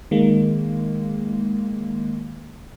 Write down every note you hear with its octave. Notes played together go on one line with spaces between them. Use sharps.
D#3 G#3 A#3